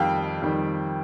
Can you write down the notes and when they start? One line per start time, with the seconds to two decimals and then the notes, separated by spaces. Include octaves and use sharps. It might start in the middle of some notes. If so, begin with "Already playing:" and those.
Already playing: F2 D#3 G3 F5 G5
0.42 F2 D#3 G3